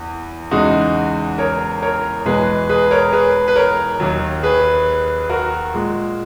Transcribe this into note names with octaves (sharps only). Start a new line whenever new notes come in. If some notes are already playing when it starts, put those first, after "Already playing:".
Already playing: E2
E2 C#3 G#3 D#4 F#4
A#4 C#5
A#4 C#5
E2 B2 G#3 G#4 B4
G#4 B4
A#4 C#5
G#4 B4
B4
A#4 C#5
D#2 D#3 F#3
G#4 B4
F#4 A#4
A#2 G#3